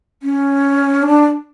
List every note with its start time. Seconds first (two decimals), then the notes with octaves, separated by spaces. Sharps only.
0.23 C#4
1.03 D4